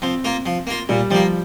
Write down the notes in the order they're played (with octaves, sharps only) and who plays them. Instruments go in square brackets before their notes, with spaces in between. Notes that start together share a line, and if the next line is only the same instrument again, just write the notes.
[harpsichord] F3 [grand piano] C4
[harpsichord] A#3 F4
F3
A#3 F4
[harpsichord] A#2 [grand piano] G3
[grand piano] F3 [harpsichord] G3 A#3